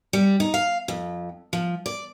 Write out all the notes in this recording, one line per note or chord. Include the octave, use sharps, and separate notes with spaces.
G3
D#4
F5
F2
F3
D5